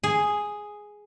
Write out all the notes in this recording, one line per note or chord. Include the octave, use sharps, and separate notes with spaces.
G#4